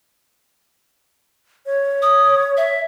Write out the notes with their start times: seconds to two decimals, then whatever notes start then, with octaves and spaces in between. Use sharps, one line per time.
1.66 C#5
2.02 D#6
2.57 E5